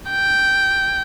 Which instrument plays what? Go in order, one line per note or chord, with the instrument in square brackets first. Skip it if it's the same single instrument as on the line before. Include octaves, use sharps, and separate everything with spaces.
[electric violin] G5